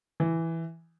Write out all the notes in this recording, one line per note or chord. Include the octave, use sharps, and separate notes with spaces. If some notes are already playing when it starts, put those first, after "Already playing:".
E3